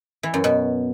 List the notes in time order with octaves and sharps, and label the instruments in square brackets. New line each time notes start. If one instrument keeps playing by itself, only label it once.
[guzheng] E3
F#2
B2